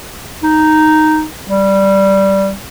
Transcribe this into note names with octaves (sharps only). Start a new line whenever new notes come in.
D#4
G3